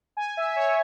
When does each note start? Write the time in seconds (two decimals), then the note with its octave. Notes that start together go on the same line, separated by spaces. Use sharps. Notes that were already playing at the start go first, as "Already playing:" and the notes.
0.17 G#5
0.37 E5
0.56 C#5